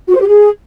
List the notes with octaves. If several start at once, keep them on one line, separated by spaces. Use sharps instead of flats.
F#4
C5
G4
G#4